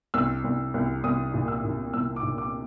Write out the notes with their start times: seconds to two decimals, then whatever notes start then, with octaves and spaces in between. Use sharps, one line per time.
0.14 C2 E6
0.44 C2
0.74 C2
1.04 C2 D#6
1.34 A#2
1.48 E6
1.64 A#2
1.94 C2 E6
2.16 D6
2.23 A#2
2.38 D6